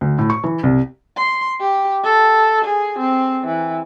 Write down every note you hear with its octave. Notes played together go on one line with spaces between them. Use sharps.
D2
A2
C#6
E3
C2
C6
G4
A4
G#4
C4
E3